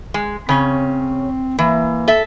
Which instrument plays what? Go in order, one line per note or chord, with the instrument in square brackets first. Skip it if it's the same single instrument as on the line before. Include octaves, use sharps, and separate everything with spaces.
[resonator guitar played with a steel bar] G#3
[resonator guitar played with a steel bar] C#3 C#4 [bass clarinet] C4
[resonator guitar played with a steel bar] E3 [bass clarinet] A#3
[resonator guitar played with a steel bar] A4 E5